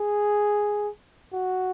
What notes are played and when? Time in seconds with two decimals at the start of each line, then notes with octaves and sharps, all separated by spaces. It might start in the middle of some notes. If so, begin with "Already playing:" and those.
Already playing: G#4
1.33 F#4